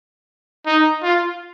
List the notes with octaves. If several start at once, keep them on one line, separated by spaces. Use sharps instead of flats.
D#4
F4